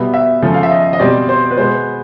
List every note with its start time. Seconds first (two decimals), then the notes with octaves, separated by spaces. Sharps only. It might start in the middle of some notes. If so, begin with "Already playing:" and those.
Already playing: B2 G3 B3 E5
0.14 E5
0.42 C#3 F3 A3
0.54 F5
0.63 E5
0.71 D#5
0.93 D#5
0.99 B2 G3 C4 D5
1.29 C5
1.51 B4
1.58 B2 G#3 B3 C5